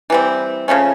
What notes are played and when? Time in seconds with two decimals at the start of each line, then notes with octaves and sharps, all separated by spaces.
0.10 E3 G3 C4
0.68 C#3 F3 A3 C#4